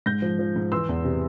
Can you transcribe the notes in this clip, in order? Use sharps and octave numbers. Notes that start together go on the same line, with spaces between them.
G#2 G6 A#6
F3
F3
G#2
E3 C6 E6
E2
C3